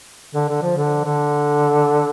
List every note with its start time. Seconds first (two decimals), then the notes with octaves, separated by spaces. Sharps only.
0.35 D3
0.49 D3
0.62 F3
0.77 D3
1.05 D3